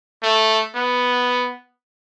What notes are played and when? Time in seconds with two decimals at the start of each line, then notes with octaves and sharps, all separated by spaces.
0.23 A3
0.75 B3